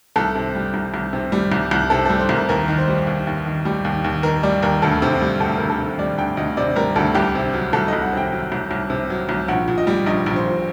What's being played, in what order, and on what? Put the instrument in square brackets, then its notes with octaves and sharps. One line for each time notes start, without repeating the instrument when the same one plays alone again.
[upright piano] C2 A4
C3
G3
C2
C2
C3
G3
C2
C2
C3 A4
G3 A4
C5
C2 A#4
D#2 A#4
D#3
C5
G3
D#2
D#2
D#3
G3
D#2
D#2
D#3 A#4
G3 D5
D#2 A#4
D2 A4
C3
G3
D2 A4
D2 A#4
A4
C3
G3 D5
D2 G5
D2 D#5
C3 D5
G3 A#4
D2 A4
C2 G4
C3
F#3
C2 A4
C2 D#5
F#5
C3
G5
F#3
C2
C2
C3
F#3
C2
A#1 F#5
A#2
D#5
G3
A#1 D#5
A#1
C5
A#2